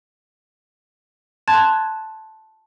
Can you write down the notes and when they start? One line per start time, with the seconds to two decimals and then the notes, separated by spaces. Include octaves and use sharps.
1.48 A5 C6 F#6 G#6 A6